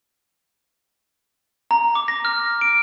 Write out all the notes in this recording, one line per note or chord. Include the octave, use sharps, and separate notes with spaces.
A#5
D6
A#6
F6
D7